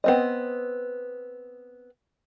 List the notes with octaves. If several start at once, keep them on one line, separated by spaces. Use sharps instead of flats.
B3 C4 D#5